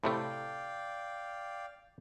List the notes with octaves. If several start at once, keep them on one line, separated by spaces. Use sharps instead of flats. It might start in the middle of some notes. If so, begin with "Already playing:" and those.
A2 C3 A3 D5 F5 G5